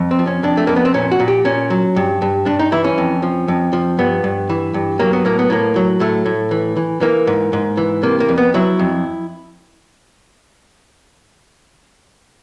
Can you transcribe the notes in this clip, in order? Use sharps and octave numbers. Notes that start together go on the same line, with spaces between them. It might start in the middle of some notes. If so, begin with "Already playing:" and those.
Already playing: F2
C4
F3
C#4
F2 D4
A3
F2 A#3
B3
C4
A#2 C#4
F#4
A#2
G4
A#2 C#4
F#3
G2
G2
G2 D4
D#4
E3 E4
C#4
F2
F3
F2
F3
G2 B3
G2
E3
G2
F#3 A#3
B3
A2 A#3
B3
A2 A#3
F#3
A2 A3
A2
E3
E3
E3 A#3
G#2
G#2
E3
C3 A#3
A#3
F2
B3
F#3 E4
F2